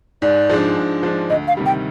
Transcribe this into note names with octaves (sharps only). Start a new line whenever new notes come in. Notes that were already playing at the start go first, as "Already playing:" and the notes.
G#2 D5
F3 G#3 D4
G#2
F3 G#3 D4
D2 D#5
F5
C3 D#3 G3
G5